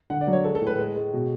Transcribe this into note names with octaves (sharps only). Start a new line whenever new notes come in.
D3 F#5
D5
F#3
C#5
G#3 A4
A4
A2
B4
G#3
G#3
B2